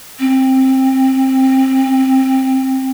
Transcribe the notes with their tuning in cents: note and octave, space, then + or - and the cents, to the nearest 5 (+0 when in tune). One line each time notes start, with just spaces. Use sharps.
C4 +15